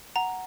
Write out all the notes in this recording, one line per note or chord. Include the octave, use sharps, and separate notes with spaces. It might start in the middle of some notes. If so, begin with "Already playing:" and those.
F#5 A#5